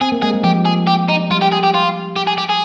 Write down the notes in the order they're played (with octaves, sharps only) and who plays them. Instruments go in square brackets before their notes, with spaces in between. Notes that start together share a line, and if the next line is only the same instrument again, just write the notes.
[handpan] C4 [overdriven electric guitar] G#4
[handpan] A#3
[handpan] G#3 [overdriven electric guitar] G#4
[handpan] G3
[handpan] F3 [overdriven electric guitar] G4
[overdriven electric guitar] G#4
G4
D#4
[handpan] G3 [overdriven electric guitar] F4
[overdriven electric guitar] G4
G#4
G4
F4
G4
G#4
G4
G#4